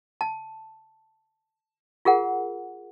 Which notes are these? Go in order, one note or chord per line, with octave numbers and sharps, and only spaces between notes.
A5
F4 G#4 A#4 F#5